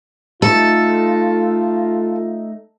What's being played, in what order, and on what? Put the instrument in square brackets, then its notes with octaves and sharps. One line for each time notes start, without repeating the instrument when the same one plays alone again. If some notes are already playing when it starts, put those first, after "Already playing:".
[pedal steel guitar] A3 D#4 [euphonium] F4 [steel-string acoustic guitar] A4